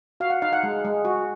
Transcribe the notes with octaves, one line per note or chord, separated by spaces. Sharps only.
F#4 F5
F#5
D#4 F5
F#5
G#3
G#3
F#4